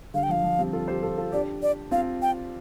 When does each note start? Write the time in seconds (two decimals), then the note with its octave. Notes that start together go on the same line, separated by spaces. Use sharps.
0.14 D3 G3 F5
0.23 G5
0.29 F3 F5
0.44 F3
0.59 G3 C4
0.73 F4 A4
0.88 G4 C5
1.03 F4 A4
1.18 F4 A4
1.32 D4 G4 D5
1.62 D5
1.91 C4 F4 F5
2.22 G5